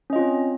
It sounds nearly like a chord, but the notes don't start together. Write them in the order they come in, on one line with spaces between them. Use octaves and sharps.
C#4 D#5 F4 C4